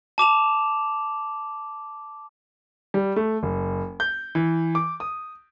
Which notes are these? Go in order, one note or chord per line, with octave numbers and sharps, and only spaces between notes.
A5 D6 E7 F7
G3
A3
F#1
G6
E3
D6
D#6